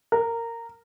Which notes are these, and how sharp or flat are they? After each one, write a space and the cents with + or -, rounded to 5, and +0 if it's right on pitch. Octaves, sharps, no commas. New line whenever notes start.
A#4 -15